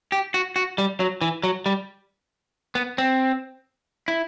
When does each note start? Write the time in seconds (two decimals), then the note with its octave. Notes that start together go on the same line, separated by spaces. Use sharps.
0.12 G4
0.34 F#4
0.56 F#4
0.78 G3
1.00 F#3
1.21 E3
1.43 F#3
1.66 G3
2.75 B3
2.98 C4
4.08 E4